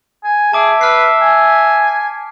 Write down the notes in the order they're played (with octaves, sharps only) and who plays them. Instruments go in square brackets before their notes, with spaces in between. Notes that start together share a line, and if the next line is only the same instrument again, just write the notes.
[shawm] G#5
[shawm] G#4 [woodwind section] E5 [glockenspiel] A5 D6 D7
[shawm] B4 [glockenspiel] F6 B6 C7
[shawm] G#5